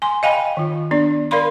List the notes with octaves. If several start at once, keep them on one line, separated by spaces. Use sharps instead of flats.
G#5 C6
D#5 F5 G5 G#5 B5
D#3 F4
B3 D4 D5
A#4 D5 F5 B5 C6